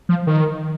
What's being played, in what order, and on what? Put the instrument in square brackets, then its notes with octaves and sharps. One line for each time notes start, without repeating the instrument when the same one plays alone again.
[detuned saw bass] F3
D#3